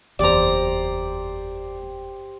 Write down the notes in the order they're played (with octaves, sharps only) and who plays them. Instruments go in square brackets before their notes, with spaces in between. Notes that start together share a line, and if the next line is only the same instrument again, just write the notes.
[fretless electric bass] F#1 E2 [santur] G4 C5 [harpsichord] D5 A#5